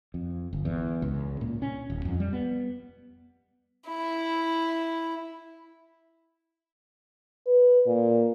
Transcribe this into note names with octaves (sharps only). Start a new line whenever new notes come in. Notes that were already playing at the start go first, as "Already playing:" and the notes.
F2
G1
E2
C#2
A#2
C#4
D#1
F2
G3
B3
E4
B4
A#2